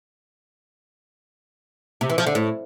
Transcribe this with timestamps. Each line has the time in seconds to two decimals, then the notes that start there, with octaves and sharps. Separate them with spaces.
2.01 C3
2.10 E3
2.18 F3
2.27 D3
2.35 A2